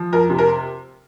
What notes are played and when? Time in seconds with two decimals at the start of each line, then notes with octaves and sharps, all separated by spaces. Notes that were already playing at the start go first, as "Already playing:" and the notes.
Already playing: F3
0.13 F2 A#4
0.30 C3
0.38 A#4